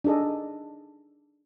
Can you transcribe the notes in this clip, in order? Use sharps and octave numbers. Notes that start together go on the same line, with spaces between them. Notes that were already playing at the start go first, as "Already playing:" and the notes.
D4 D#4 G#4 A4 D#5